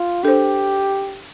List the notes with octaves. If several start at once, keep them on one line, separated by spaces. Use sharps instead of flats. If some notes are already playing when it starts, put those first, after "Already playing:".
Already playing: F4
D4 G4 A4 C5